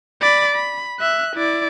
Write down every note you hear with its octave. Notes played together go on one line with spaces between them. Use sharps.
D5 B5
B5
E5 F#6
E4 D5